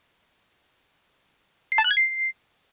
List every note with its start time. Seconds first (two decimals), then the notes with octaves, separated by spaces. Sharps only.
1.72 C7
1.78 A5
1.84 F#6
1.91 G#6
1.97 C7